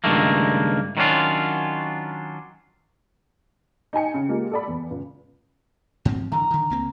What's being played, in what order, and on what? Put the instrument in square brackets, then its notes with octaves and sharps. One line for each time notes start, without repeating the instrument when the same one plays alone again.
[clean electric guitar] C#2 G2 D#3 A3 A#3
D#3 F#3 C#4 D4 F4
[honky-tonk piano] D#4 G5 G#5 C#7
C#3
G#3 A#3 F4 G4
A4 D5 B5
E2
C#2
[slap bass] G#2 F3 C4
[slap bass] D3 E3 [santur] A#5
[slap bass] D3 D#3
C#2 A#3 C4